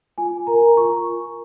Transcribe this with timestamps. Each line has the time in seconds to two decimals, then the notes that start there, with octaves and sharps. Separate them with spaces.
0.18 F4 G#5
0.47 A#4 A#5
0.77 F4 C#6